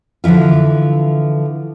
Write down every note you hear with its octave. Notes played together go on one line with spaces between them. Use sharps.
D3 E3 F3 E4 F4